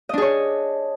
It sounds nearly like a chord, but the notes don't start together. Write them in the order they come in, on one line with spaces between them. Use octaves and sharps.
D#5 D4 G#4 C#5